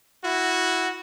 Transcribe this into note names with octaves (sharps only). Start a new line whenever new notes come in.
E4 F#4